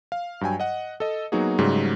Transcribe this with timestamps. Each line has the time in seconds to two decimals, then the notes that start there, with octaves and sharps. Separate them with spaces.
0.12 F5
0.41 G2 F#3 G5 G#5
0.60 D#5 F#5
1.00 A4 D#5
1.32 F#3 A#3 B3 D#4 F#4 G#4
1.59 G#2 C#3 F#3 G3 A3